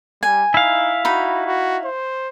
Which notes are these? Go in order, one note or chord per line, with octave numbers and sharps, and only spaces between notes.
G3 G#5
D#4 E4 F5
D#4 F#4 B5
F#4
C5